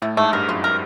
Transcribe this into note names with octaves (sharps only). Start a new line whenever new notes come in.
A2 A3
G#2 A3
G2 A#4
F#2 F4
A#4